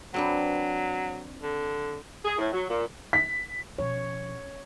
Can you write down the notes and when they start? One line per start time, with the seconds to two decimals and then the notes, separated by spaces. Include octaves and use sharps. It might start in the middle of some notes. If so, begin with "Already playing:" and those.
0.14 F#3 C4 D4 B4
1.43 D3
2.25 G#4
2.38 A2
2.53 F#3
2.69 A#2
3.13 B6
3.79 B2 F3 C#5